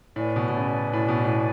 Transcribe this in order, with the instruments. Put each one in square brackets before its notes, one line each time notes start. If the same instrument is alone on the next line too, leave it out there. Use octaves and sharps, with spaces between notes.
[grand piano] A2 [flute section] B4 D5 G#5
[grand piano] B2
B2
C#3
A2
B2
A2